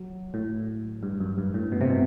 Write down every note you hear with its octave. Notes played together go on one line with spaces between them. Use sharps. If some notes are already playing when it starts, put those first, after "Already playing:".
Already playing: F#3
A2
G2
F#2
G2
A2
B2
C3
B2